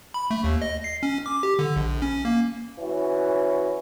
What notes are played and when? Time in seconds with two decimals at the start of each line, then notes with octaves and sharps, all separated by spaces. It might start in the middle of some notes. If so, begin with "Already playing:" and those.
0.14 B5
0.31 A3
0.44 D#2
0.62 D#5
0.84 C7
1.03 C#4
1.26 D6
1.43 G4
1.59 D3
1.76 A#1
2.02 C#4
2.25 A#3
2.79 E3 C#4 F#4